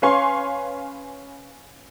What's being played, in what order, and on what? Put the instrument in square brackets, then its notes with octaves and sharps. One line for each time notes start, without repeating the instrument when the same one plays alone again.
[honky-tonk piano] C#4 B4 F5 G#5 C6 C#6